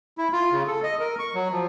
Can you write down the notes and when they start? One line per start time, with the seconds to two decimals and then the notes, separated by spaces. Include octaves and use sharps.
0.18 E4
0.32 F4
0.52 C#3
0.67 A4
0.83 D#5
1.00 A#4
1.19 C#6
1.35 F#3
1.52 F3